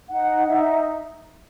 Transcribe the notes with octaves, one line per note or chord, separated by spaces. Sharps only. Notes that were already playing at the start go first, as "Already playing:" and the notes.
D#4 F#5
D#4 E5